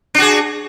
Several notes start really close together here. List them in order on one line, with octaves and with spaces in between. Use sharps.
D4 F#4 G#4